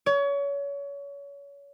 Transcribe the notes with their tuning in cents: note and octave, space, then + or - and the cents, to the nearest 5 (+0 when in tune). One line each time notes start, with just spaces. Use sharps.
C#5 +30